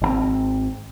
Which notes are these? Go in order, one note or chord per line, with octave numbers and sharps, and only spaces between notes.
G#1 D3 C4